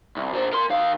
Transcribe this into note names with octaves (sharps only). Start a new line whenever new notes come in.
C2
A#2 C5
A#4 C6
D#2 F5